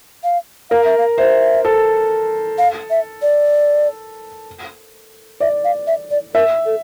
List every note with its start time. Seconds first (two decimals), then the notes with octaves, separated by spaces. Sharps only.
0.24 F5
0.70 A#4 F5
0.85 E5
0.98 F5
1.18 C5 E5
1.65 A4
2.58 F5
2.90 E5
3.22 D5
5.40 D5 E5
5.64 F5
5.87 E5
6.11 D5
6.34 A#4 E5
6.66 A4